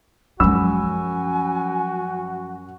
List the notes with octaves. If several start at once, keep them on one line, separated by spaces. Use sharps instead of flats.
F#2 F3 G#3 F#4 G#5 B5 E6